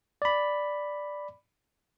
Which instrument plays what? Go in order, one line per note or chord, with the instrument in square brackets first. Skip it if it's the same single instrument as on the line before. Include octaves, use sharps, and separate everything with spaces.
[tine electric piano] D5 B5